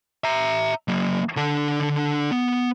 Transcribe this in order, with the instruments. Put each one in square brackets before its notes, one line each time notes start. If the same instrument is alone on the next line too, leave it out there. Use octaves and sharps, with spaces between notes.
[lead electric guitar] E5 A#5
F#3 A#3
D3 D4
B3